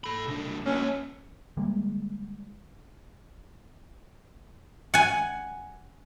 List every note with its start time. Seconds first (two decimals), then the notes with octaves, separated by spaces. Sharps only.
0.04 A4 B5
0.27 C2 D4
0.66 A#3 C#4 C#5
1.57 D3 G3 G#3 A#3
4.94 F#5 G#5